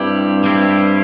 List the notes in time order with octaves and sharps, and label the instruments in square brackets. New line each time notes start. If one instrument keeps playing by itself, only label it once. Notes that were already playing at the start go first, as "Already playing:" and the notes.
Already playing: [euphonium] G2 [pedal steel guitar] G3 C4 E4 G4
[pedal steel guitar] G3 C4 E4 G4